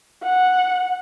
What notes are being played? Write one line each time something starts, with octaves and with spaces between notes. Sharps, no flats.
F#5